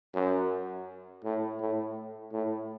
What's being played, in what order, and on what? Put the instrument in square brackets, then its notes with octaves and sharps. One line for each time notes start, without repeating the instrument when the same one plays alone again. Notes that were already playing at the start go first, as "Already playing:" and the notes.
[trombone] F#2
A2
A2
A2